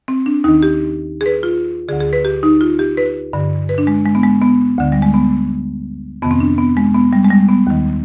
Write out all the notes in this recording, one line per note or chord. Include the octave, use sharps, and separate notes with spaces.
C4
D4
D#2 D#3 D#4
G4
G#4
B4
F4
D2 D3 G#4
G#4
B4
G4
D#4
F4
G4
B4
G2 D3
B4
D4
G#3
G#3
B3
G#3
B3
D2 D3
G3
G#3
B3
F2 C3 D#3 B3
C4
D4
B3
G#3
B3
G3
G#3
G3
B3
D#2 D#3